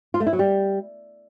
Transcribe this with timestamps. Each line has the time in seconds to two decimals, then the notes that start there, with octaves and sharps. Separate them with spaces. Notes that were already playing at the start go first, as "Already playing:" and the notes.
0.14 F4
0.20 A3
0.27 E4
0.33 F#3
0.39 G3